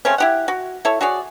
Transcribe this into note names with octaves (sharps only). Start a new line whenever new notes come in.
C#3 A3 C4 C#4
E4 G4 F#5
F#4
E4 A4 C#5
F#4 G#4 C#5 D5